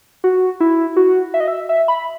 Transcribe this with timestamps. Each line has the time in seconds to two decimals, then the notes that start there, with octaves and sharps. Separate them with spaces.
0.24 F#4
0.60 E4
0.96 F#4
1.34 E5
1.40 D#5
1.48 E5
1.69 E5
1.88 B5